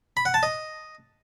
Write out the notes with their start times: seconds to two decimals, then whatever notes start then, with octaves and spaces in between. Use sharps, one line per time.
0.17 B5
0.25 F#5
0.34 A5
0.43 D#5